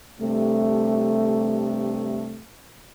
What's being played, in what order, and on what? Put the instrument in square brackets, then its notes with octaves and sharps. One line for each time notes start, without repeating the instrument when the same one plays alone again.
[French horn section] G2 C3 A3